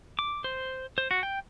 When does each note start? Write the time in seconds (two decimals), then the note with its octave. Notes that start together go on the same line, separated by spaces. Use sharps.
0.19 D6
0.44 C5
0.98 C5
1.11 F#4
1.23 G5